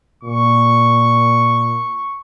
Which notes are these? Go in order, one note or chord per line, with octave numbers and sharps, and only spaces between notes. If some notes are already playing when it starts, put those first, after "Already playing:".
A#2 C#6